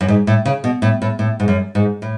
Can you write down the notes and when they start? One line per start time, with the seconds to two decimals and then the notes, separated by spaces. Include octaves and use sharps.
0.01 F#2
0.08 G#2
0.27 A2
0.46 C#3
0.64 B2
0.82 A2
1.02 A2
1.19 A2
1.40 G#2
1.48 F#2
1.75 G#2
2.02 A2